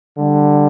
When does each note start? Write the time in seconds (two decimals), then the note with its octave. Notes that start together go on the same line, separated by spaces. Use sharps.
0.16 D3 G3